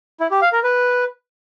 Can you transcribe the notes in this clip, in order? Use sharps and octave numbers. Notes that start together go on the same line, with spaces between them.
E4
G4
F5
A#4
B4